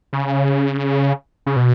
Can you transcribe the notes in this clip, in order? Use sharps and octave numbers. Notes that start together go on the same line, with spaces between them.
C#3
C#3
B2